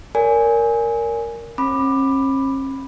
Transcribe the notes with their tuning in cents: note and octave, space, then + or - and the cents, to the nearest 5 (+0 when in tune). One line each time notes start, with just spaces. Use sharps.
A#4 -5 D5 -45 G#5 +0
C#4 -45 B5 +0 D6 +15